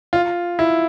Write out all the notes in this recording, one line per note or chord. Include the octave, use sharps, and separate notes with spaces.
F4
E4